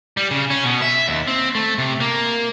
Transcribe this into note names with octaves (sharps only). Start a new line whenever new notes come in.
G3
C#3
C#4
B2
E5
D#2
C4
A3
C3
A#3